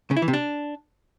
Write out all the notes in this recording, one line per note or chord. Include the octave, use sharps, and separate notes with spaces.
C#3
E4
E3
C3
D4